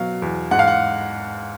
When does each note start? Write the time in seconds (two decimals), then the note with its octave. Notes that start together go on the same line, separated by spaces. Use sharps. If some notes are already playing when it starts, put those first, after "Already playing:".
Already playing: B2 F#3 F5
0.22 E2
0.51 G#2 F#5
0.59 F5
0.68 F#5